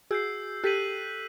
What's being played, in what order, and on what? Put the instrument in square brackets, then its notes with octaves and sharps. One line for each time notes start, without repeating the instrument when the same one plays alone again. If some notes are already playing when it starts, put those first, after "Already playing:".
[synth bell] F#4 G#4 [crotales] E6 G6 C7
[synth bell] G4 A4 [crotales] F#6 B6 D#7 F#7